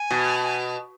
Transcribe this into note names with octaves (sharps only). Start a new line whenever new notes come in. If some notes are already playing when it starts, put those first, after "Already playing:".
Already playing: G#5
B2
G#5